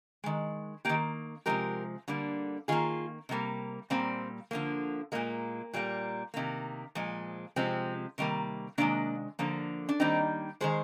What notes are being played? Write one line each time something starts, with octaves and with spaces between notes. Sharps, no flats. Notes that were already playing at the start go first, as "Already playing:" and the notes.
D#3 G#3
D#3 A#3 G4 A#4
C3 F3 G#3 G4 A#4
D3 G3 A#3
D#3 A#3 F4 G#4
C3 G3 A#3
A#2 G3 A#3 C4
D3 F3 A#3
A#2 G#3 A#3
A#2 G3 A#3
C3 D#3 A#3
A#2 F3 G#3
C3 F3 G#3 C4
C3 D#3 G3 A#3
C3 D#3 G#3 A#3 D4
D3 F3 A#3
D4
D#3 G3 A#3 C4 D#4
D#3 G#3 G#4 C5